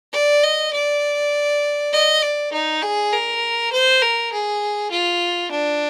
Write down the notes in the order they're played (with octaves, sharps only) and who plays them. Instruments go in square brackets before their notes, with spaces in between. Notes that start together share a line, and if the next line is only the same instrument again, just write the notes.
[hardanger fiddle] D5
D#5
D5
D#5
D5
D#4
G#4
A#4
C5
A#4
G#4
F4
D4